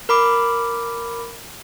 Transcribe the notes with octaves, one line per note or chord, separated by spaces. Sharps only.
A#4 B5 D6